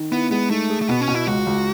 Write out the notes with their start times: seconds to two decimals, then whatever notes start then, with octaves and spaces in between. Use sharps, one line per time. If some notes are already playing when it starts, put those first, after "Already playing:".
Already playing: D#3
0.12 B3 E4
0.31 G#3 B3
0.50 A3 D#4
0.70 G#4
0.82 A3
0.89 B2 B3
1.01 C#4
1.08 B2
1.15 E4
1.27 C#2 F#4
1.46 C#2